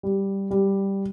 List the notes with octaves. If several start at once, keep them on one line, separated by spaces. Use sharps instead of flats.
G3
G3